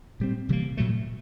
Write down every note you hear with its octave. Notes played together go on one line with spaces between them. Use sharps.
A#2 G3 C4
C3 E3 G3 A#3
A#2 F#3 A3